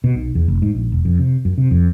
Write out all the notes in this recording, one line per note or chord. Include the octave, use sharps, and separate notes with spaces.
B2
B1
E2
F1
G#2
A#1
E1
F2
C3
F#2
C3
F2